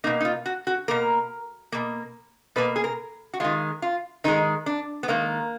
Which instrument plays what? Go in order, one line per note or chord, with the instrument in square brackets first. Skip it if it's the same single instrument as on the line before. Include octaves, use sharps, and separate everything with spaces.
[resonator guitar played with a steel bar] A#3 D#4
B2
D#4
F4
F#4
F#4
B2 A#3 A#4
B2 A#3
B2 A#3 B4
G#4
A#4
F#4
D#3 G#3 F4
F4
D#3 G#3 D#4
D4
B3
D#3 G#3 A#3